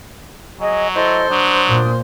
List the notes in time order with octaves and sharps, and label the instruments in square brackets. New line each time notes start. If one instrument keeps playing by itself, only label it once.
[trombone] F#3 [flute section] G#4 D#5 G#5
[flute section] E4 A4 D#5 [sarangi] C5
[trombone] F#3 [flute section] D4 D#6
[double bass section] A#2